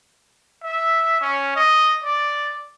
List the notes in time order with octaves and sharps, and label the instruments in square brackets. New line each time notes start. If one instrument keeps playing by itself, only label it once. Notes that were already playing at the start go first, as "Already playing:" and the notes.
[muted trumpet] E5
C#4
D#5
D5